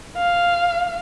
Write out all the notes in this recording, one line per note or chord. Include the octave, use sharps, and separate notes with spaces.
F5